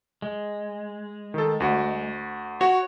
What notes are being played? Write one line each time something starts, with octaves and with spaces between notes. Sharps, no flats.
G#3
D#3 A4
D2 F#4
F#4 C#5